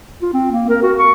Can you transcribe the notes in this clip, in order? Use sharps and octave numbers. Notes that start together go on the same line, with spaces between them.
F4
C4
A#3
A#4
F#4
C#6